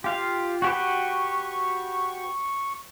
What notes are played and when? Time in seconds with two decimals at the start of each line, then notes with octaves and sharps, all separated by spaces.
0.04 F4 G4 F5
0.62 F#4 G4 B4 C#6